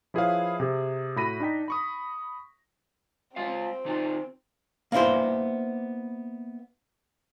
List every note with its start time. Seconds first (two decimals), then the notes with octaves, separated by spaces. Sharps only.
0.14 F3 E4 G#4 B4 C#5 F5
0.60 C3 G#4
1.16 A2 F#4 B5 A#6 D#7
1.40 D4 D#4 G5 B6
1.68 B5 C#6 D#6
3.36 G#3 C4 F4 F5
3.85 D3 D#4 F4
4.92 A#3 B3 D4 E4 C5